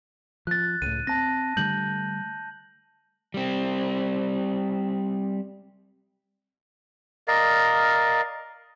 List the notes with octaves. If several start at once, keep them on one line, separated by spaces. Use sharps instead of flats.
F3 F#6 A6
C#2 A2 D#7
C4 A5 A#6
D3 G3 A3 G6 F#7
G3 C4
A#4 D5 D#5 F5